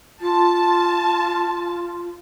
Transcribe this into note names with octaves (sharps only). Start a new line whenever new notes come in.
F4 A5